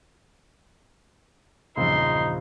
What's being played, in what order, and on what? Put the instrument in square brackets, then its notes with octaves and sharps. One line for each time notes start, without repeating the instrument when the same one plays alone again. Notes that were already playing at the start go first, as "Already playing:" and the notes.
[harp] A#1 E6 [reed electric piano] E2 G2 C#3 [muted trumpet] D#4 [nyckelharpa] C6